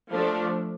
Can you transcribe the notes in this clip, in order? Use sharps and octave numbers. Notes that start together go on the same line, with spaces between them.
F3 A3 D4